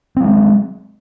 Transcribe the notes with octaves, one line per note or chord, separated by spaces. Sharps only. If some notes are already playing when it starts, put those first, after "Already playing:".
F#3 G#3 C4